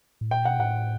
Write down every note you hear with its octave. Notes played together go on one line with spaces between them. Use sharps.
A2
A#2 G5
B2 F#5
A2 F#5